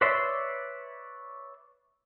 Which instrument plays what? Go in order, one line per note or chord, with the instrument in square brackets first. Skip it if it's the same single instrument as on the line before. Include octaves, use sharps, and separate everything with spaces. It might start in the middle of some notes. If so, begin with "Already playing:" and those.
[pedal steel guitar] B4 C#5 D5 E5 C6